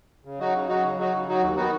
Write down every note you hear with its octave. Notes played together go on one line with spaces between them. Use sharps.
C#3
F#3 D#4 F#4
C#3
F#3 D#4 F#4
C#3
F#3 D#4 F#4
C#3
F#3 D#4 F#4
D#2
D#3 B3 D#4 F#4